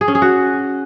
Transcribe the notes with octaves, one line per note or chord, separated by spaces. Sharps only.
G#4
C#4
G#4
F#4